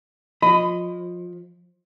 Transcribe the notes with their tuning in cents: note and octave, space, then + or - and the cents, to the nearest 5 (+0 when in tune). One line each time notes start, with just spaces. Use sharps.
F3 +20 D#5 +0 B5 +30